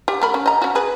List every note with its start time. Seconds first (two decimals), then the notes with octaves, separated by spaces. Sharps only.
0.08 G4
0.22 A3 A#4 B5
0.34 C#4
0.46 D#5 A#5
0.62 C#4 F#4
0.75 G#4 B4